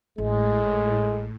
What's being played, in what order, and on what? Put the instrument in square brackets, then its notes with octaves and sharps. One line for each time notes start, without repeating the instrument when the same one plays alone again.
[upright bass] A1 [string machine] A2 [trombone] G#3